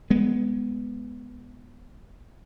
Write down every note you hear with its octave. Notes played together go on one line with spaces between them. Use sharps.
G#3 B3